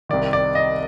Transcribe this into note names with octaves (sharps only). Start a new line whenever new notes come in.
C2 C3 D#3 D5
D5
D#5